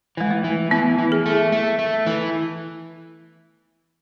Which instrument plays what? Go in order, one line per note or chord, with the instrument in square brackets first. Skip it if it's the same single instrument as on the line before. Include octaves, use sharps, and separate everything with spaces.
[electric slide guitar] E3 [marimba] G#3
[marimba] A3
[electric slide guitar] E3
[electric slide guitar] E3 [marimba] B3
[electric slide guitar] E3
[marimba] G#4
[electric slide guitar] A3
A3
A3
E3